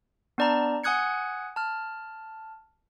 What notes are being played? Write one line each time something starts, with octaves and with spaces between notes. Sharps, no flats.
B3 D4 D5 A5 A#5
F#5 G#5 D#6 F#6 G#6 C#7
A5 F6